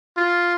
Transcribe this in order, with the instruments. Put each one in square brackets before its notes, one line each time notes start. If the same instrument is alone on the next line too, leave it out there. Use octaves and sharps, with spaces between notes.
[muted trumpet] F4